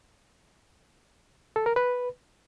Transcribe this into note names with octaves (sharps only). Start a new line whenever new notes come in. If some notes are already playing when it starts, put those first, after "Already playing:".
A4
A#4
B4